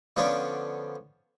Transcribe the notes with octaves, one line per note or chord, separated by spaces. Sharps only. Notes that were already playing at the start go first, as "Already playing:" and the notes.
D3 F3 B3 C#4 D4